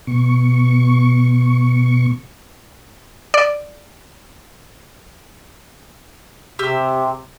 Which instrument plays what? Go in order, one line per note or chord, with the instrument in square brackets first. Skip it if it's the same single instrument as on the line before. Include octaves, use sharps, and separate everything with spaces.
[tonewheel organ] B2 C#6
[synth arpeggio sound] D5
[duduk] C3 [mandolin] G4 E6